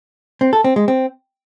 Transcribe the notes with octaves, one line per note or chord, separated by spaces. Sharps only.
C4
A4
C4
G#3
C4